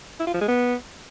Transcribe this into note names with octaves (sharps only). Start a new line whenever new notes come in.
E4
F4
F3
G#3
B3